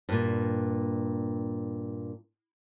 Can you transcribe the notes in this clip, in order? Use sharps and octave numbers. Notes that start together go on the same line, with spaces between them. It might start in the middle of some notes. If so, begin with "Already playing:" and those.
G2 A#2